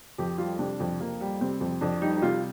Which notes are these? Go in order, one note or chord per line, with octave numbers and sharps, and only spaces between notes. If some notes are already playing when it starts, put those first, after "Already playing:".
F2 G4
G3 F4
C3 D4
F2
F2 A#3
G3
C3 C4
F2
F2 D4
G3 D#4
D#4
C3 F4